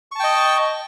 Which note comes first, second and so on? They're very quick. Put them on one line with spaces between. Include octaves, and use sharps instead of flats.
C#6 A5 G5 D#5